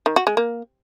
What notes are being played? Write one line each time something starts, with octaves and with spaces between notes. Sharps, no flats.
D#3
F#4
G#3
A#3